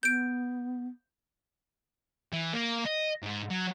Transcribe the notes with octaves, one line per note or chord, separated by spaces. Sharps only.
B3 G6 D7
E3
A#3
D#5
G#2
F#3